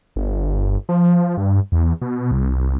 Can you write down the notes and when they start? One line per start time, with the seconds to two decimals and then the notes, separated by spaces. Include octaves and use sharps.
0.16 G1
0.89 F3
1.37 G2
1.72 E2
2.02 B2
2.31 C2